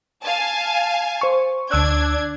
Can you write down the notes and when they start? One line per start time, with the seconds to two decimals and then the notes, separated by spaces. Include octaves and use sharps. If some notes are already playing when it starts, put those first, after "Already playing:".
0.23 F5 G#5 A5
1.21 C5 C#6
1.71 D2 D4 E6 F#6 G#6